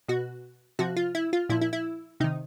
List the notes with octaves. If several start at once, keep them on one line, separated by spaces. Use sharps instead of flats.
B2 F#4
C3 F3 F#4
F4
E4
F4
A#2 F3 E4
E4
E4
C3 D#3 D#4